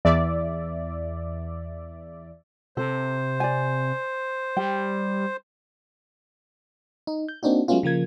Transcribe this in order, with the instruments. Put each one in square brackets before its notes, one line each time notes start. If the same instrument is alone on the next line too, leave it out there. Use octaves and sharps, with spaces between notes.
[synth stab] E2 D5 E5
[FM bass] C3 [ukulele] A4 [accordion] C5
[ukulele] D5 G#5
[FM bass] G3 [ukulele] G5
[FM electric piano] D#4
G6
A#3 C4 D4 D#4 F#4
F#3 G#3 A3 B3 C#4 F4
C#3 F3 A#3 G#6